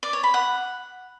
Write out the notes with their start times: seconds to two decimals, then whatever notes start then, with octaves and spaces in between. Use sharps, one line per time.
0.03 D5
0.13 C#5
0.23 B5
0.34 F#5